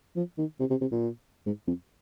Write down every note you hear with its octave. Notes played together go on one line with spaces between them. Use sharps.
F3
D#3
C3
C3
C3
A#2
G#2
F2